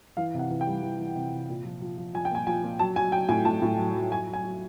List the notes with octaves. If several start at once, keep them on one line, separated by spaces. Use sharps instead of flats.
E3 F5
C3 F#5
E3
G5
G3
E3
E3
C3
C3
A#2
F3
F3
F3
F3 G#5
G5
A#2 G#5
F3 G#5
A#2
F#3 A5
F#3 G#5
F#3 G5
A2 G#5
A2 A5
A2
F#3
F#3
F#3 G#5
F#3
G#5
F#3